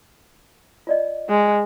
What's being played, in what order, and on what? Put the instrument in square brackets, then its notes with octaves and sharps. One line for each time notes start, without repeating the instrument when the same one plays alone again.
[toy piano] F4 D5 D#5
[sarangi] G#3